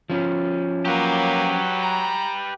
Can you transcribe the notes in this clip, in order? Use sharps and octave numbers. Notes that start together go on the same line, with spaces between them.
F3 C#4
F#3 A#3 G4 B4
A#5